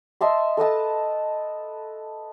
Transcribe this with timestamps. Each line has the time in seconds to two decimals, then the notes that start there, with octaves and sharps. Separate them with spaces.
0.21 D#5 E5 A5 C6
0.57 A4 B4 D#5 A5